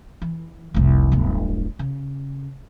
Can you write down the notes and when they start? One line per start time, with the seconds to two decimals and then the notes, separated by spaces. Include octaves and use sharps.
0.22 E3
0.74 F1 C2
1.12 D1 G1
1.79 C#3